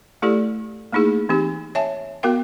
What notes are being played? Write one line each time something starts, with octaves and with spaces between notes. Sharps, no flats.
A3 E4 G4 A4 D5
A3 A#3 D#4 E4 G#4
E3 C4 D#4 G4
C#5 E5 G#5 A5
B3 F#4 A#4 F5 G5